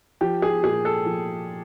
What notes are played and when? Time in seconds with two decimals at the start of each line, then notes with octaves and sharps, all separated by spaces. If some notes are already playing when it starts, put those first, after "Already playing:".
0.21 F3 G4
0.42 G#4
0.64 A#2 G#4
0.85 A4
1.06 F3